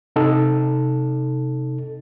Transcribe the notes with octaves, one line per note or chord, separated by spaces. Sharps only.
C3 D#4 A4